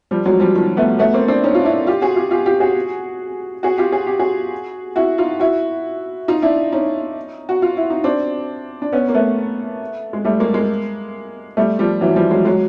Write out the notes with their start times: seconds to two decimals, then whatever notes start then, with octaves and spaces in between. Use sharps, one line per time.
0.11 F3 G3
0.26 F#3 G#3
0.40 F3 G3
0.55 D#3 F3
0.77 A3 B3
0.99 A3 B3
1.14 A#3 C4
1.28 C4 D4
1.44 C#4 D#4
1.54 F4
1.65 D4 E4
1.87 F4 G4
2.02 F#4 G#4
2.16 F4 G4
2.31 F4 G4
2.46 F4 G4
2.60 F#4 G#4
3.63 F#4 G#4
3.78 F4 G4
3.92 G#4
4.07 G4
4.19 F#4 G#4
4.96 E4 F#4
5.18 D#4 F4
5.40 E4 F#4
6.28 D#4 F4
6.42 D4 E4
6.72 C#4 D#4
7.49 F#4
7.62 F4
7.77 E4
7.90 D#4
8.04 C4 D4
8.82 D4
8.92 B3 C#4
9.09 A#3
9.14 A3 B3
10.13 G#3
10.24 G3 A3
10.40 G#3 A#3
10.54 G#3 A#3
11.57 G3 A3
11.79 F3 G3
12.01 E3 F#3
12.16 F3 G3
12.31 F#3 G#3
12.45 F#3 G#3